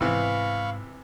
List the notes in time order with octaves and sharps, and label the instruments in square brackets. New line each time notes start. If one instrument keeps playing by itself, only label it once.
[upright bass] G#2 [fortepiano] C3 E3 B3 [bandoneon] F5 B5 C#6